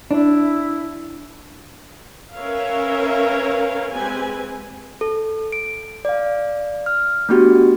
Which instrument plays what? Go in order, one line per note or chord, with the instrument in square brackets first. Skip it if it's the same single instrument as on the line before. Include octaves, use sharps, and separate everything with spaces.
[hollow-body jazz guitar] D4 [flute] E4
[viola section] C#4 A#4 B4 C#5 E5 F5
G#3 C4 G4 B4 G#5
[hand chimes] A4
D7
D5 F5
F6
A3 B3 D4 F#4 G4